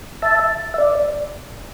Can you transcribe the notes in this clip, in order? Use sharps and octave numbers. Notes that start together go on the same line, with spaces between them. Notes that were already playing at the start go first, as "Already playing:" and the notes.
E5 A5
E5
D5